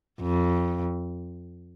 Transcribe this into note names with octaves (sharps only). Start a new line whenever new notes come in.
F2